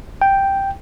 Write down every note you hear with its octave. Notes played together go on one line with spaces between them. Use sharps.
G5